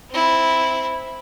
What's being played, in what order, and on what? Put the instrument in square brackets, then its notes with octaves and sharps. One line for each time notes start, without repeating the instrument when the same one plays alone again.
[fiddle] C4 E4